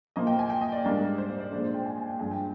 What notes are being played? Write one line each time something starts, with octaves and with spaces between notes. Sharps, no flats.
A#2 F3 A#3 D#5
G5
G#5
G5
D#5
D5
G#2 G3 A#3 D4
C5
D5
D5
A#2 F3 G#3 D4 D5
C5
G5
G#5
G#5
G5
G2 F3 G#3 G#5
G5